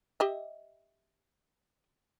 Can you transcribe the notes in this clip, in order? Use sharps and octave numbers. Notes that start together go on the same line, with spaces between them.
G4 D#5 E5